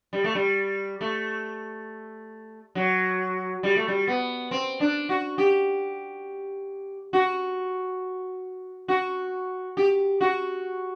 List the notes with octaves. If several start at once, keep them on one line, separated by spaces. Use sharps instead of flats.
G3
A3
G3
A3
F#3
G3
A3
G3
B3
C4
D4
F#4
G4
F#4
F#4
G4
F#4